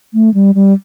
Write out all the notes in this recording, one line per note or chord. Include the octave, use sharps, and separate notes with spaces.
A3
G3
G3